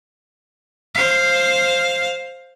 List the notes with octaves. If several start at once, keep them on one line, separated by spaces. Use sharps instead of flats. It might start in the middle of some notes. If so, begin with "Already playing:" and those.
C5 F5